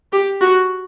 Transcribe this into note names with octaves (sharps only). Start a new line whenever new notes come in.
G4
F#4